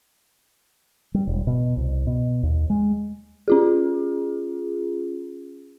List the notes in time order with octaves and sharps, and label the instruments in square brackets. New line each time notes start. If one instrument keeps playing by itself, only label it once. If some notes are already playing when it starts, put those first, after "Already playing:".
[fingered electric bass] G3
E1
B2
C2
B2
D#2
G#3
[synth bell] C#4 F4 G#4